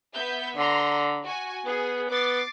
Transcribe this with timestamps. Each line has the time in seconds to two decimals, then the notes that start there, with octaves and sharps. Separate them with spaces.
0.14 B3 E5 G6
0.57 D3 A#5 C6
1.24 F#4 G#5
1.66 B3 G#4
2.11 B3 D6 A6 C7